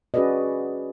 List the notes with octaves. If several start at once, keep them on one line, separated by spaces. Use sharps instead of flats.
C#4 F#4 G#4 B4 D5 D#5